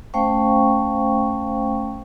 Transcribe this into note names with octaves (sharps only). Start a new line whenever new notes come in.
A3 C#4 C5 F5 G5 C#6